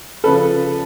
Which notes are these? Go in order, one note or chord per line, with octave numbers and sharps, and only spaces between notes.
C#3 F3 A4 B4